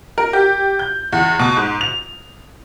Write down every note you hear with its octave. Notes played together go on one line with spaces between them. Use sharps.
A#4
G4
G6
E2
B2
G#2
F7